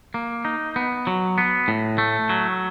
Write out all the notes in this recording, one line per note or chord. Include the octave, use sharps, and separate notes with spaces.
A#3
D#4
B3
F#3
B3
A2
A3
F#3